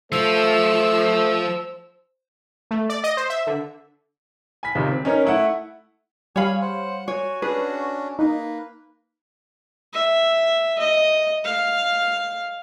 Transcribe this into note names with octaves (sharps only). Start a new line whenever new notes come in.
F3 A3 C5 E6
A3
D5
D#5
C5
E5
D3
G#5 B5 B6
C#2 C3 D#3 G#3
C4
C#4 D#4 A#4 C#5
A3 E4 F#5
G3 G#4 C#5 F5 G#5 B5
C5 F#5
F#4 C#5 G#5
C#4 D4 G#4 B4
A#3 D#4 B4
E5
D#5
F5